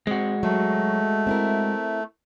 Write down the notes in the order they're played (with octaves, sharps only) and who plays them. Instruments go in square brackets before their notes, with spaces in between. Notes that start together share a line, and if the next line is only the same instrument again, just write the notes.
[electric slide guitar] G#3 F#4 [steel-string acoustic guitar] C4
[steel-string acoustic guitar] F#3 [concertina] A3
[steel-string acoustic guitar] C4 E4 A#4